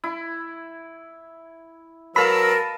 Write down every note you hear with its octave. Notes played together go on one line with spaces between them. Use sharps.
E4
F#3 A#4 B4 D#5 F5 A5 B5 E6